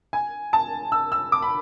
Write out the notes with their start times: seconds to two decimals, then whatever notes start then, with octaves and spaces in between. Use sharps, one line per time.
0.13 G#5
0.53 A5
0.92 E6
1.12 E6
1.32 D6
1.42 B5